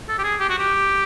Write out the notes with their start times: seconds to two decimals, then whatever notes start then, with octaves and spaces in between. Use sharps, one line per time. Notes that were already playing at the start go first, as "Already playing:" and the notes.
0.09 A4
0.19 G4
0.24 G#4
0.40 G4
0.50 F#4
0.59 G4